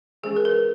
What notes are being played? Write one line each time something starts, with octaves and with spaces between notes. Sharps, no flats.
E3 G#3 C#4 G#4
A#4
B4